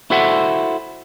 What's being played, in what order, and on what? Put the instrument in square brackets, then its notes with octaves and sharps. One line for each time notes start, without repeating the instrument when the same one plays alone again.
[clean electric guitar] E4 F#4 A4 C5 E5 F#5